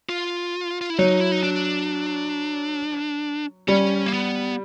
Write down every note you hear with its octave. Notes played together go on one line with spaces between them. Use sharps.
F4
F4
E4
F#3 D#4
E4
D#4
D4
G3 C#4
A#3
B3